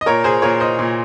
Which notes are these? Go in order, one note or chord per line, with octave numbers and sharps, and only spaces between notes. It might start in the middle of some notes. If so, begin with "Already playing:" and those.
D#5
A#2 A#4 C#5
G#4 C5
A#2 A#4 C#5
C5 D#5
A#2